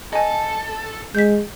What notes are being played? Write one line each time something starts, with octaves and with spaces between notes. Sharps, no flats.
A4 D#5 G#5
G#3 G6 B6